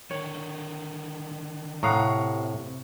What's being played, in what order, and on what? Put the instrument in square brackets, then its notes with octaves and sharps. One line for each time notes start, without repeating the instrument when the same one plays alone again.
[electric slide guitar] D3 D#3 A#4 [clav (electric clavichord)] C#5
[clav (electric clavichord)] A2 F5 F#5 [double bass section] C3 [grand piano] A#5 C#6 D#6